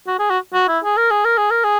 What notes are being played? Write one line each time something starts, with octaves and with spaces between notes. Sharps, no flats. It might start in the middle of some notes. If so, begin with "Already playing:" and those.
F#4
G#4
F#4
F#4
E4
G#4
A#4
G#4
A#4
G#4
A#4
G#4